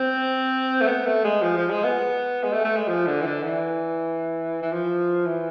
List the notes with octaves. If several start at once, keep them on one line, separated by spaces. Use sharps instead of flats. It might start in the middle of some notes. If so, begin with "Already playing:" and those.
Already playing: C4
A3
B3
A3
G#3
F3
F3
G#3
B3
G#3
A3
A3
G#3
F3
D3
E3
D3
E3
E3
F3
E3